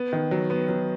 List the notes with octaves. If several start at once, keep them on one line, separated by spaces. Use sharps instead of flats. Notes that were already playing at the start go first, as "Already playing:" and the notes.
Already playing: B3
D#3
F#3
B3
F#3